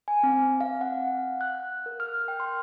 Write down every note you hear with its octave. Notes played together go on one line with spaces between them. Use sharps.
G#5
C4
F5
F#5
F#6
A#4
F6
G5
C6